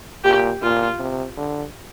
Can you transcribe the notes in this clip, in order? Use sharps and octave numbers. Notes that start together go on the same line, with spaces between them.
A#2 G4
A#2 F4
C3
D3